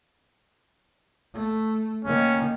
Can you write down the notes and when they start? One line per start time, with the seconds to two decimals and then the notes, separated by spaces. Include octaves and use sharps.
1.34 A3
2.05 D#3 A#3 C#4